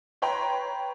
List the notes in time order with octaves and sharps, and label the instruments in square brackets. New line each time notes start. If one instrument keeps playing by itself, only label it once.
[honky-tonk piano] B4 C#5 G5 A#5 C6